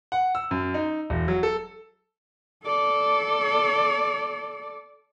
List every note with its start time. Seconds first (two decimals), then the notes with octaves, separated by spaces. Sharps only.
0.12 F#5
0.35 E6
0.51 F#2
0.74 D#4
1.10 E1
1.28 F#3
1.43 A4
2.64 A4 D5